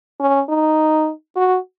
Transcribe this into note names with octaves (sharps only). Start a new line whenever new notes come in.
C#4
D#4
F#4